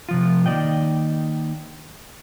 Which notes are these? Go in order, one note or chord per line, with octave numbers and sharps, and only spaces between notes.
C3 F3 F4
D#3 A#3 D5 D#5 G5